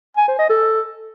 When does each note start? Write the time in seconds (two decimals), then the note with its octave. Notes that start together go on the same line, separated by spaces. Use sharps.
0.17 G#5
0.28 C5
0.39 D#5
0.50 A4